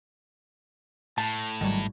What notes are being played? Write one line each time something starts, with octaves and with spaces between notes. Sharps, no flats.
A2 A5
G#1 D#3 F#3 G3